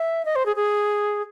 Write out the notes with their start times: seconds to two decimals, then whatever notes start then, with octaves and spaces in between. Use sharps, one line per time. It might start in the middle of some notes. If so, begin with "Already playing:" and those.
Already playing: E5
0.25 D#5
0.36 C5
0.46 G#4
0.56 G#4